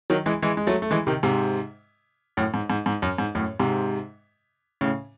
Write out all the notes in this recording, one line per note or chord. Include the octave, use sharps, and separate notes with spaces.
D#3 F#3
E3 G#3
E3 G#3
G#3
F#3 A3
A3
E3 G#3
C3 D#3
G#2 C3
F#2 A2
G#2
G#2
G#2
F#2
G#2
F#2 A2
G#2 C3
A2 C#3